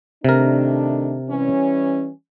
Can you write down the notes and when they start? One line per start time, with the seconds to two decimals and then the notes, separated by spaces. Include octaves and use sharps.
0.24 C3 D#3 A3 D4 A#4
1.29 E3 G3 C#4